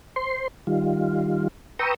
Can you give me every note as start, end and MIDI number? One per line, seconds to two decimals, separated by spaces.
0.16 0.48 72
0.16 0.48 84
0.67 1.48 51
0.67 1.48 55
0.67 1.48 65
1.79 1.94 71
1.79 1.94 79
1.79 1.94 82
1.79 1.94 85
1.79 1.94 87
1.79 1.94 88